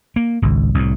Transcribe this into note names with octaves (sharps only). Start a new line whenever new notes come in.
A#3
G#1 C#2
C2 A2